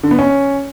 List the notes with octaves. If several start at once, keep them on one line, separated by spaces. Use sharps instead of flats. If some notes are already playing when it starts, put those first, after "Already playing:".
D3
B3
C#4